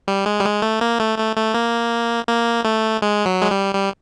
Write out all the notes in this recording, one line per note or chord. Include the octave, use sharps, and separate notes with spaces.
G3
G#3
G3
G#3
A3
A#3
A3
A3
A3
A#3
A#3
A3
G#3
F#3
G#3
G3
G3